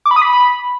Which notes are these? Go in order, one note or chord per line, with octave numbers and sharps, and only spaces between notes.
D6
B5
D#6
B5